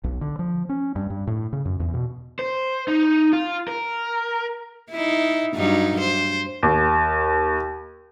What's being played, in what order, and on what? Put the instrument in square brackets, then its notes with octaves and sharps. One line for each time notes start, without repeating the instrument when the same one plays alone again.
[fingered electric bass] B1
D3
F3
C#4
G2
G2
A2
C#3
F#2
E2
B2
[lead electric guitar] C5
D#4
F4
A#4
[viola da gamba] D#4 E4
G2 F#3 D#4
C5
[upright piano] D#2